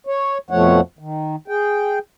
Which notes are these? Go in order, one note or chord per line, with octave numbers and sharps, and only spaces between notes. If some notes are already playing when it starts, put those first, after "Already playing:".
C#5
F2 B2 F3 A3 C#5 F#5
D#3
G#4 G5